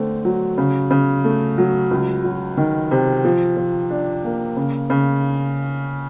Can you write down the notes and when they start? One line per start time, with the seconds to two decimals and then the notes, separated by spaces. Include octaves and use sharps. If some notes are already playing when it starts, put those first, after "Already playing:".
Already playing: D3 A3 C4
0.25 F#3
0.58 C#3
0.91 C#3
1.24 A3
1.58 F#3
1.91 C#2
2.24 F#3
2.57 D#3
2.91 C3
3.24 F3
3.57 F3
3.90 D4
4.24 A#3
4.56 C#3
4.90 C#3